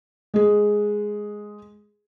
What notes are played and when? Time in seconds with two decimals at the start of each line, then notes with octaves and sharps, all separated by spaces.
0.34 G#3 G#4